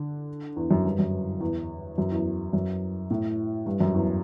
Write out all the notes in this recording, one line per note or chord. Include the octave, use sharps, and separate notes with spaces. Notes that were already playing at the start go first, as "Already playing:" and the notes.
Already playing: D3
E2
F#2
G2
F#2
E2
F#2
E2
F#2
A2
G2
F#2
E2